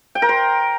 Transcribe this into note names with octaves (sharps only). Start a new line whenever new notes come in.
G5
A#4
C6